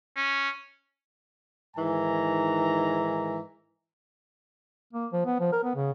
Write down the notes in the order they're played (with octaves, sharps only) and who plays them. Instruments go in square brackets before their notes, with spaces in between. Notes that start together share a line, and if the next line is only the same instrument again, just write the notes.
[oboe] C#4
[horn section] G#2 D#3 E3 G#5 A#5
[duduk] A#3
F3
B3
F3
A#4
B3
C#3